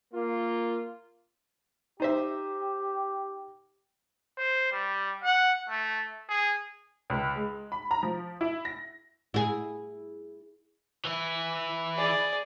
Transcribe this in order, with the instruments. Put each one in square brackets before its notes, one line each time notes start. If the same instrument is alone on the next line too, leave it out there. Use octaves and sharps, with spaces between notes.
[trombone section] A#3 F4
[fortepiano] D#4 C5 E5 [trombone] G4
[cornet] C5
G3
F#5
A3
G#4
[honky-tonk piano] C#2
G#3
B5
A#5
F3
E4
A#6
[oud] E4 G#4
[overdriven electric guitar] E3 E4
[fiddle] G#4 D5